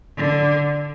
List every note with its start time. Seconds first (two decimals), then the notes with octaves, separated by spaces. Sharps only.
0.17 D3